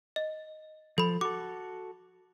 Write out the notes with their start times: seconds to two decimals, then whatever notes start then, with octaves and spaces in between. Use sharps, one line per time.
0.16 D#5
0.98 F3 A4 B5
1.21 F#4 A4 D6